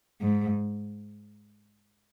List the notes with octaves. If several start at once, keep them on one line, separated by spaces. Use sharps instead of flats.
G#2